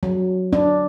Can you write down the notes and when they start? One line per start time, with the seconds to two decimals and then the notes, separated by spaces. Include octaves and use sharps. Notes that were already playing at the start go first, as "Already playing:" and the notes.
0.03 F#3
0.53 D4